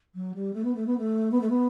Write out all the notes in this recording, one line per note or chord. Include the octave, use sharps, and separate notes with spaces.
F#3
G3
A3
B3
A3
B3
A3
B3
A3
B3